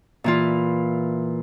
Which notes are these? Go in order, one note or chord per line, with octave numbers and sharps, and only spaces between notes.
A#2 E3 F4